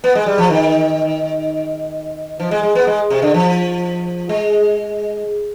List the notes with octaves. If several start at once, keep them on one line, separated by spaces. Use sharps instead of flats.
B3
G#3
G3
F3
D#3
F3
G#3
G#3
B3
G#3
C3
D3
F3
G#3